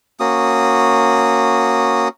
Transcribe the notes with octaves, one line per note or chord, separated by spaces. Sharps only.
A#3 C#4 F#4 D#6